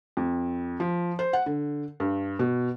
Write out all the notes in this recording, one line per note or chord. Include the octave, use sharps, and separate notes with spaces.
F2
F3
C5
F#5
D3
G2
B2